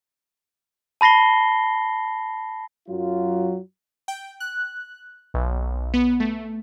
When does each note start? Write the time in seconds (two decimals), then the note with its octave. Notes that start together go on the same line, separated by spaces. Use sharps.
1.01 A5 B5 A#6 C7 G7
2.88 F#2 F#3 F4
4.08 G5
4.40 F#6
5.34 B1
5.94 B3
6.20 A3